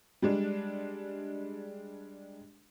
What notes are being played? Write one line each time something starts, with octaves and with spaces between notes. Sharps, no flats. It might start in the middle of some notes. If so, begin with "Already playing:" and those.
G3 G#3 D4